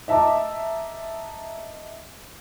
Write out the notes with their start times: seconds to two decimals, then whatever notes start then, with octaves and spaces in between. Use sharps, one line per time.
0.08 D#5 E5 A5 A#5 D6